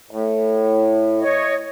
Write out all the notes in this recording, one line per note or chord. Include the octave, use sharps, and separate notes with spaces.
A2
C#5 D#5